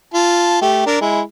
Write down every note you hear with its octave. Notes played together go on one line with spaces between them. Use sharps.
F4 A5
A3 G4
D4 A#4
G#3 E4